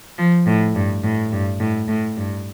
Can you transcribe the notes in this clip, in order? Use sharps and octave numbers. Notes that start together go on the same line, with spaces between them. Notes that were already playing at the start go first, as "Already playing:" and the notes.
F3
A2
G2
A2
G2
A2
A2
G2